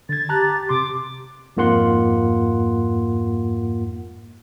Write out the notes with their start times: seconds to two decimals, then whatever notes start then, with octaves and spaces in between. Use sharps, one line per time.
0.09 D3 G#6 A6
0.29 G4 A5 A#5 F#6
0.69 C3 C6 D6
1.57 F2 G#2 A#3 F4 F#5 C6